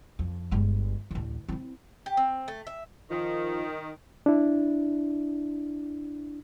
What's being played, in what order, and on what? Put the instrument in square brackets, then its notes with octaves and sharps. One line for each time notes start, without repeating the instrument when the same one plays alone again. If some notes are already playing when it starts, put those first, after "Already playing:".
[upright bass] F2
G1 G#3
A1 D2
C4 E4
[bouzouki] G4
C4
A3
E5
[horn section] D#3 [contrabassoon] F3
[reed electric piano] D4 E4